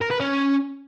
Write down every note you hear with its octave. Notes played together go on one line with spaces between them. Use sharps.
A#4
B4
C#4